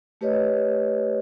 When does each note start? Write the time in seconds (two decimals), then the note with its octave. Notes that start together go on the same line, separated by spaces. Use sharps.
0.21 A3 G4 B4 C#5 D#5